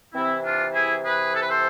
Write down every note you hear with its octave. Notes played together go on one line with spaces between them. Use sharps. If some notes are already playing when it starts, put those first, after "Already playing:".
C3 E3 C4 E4
D4 F4
E4 G#4
G#4 B4
A4
B4
A4 C5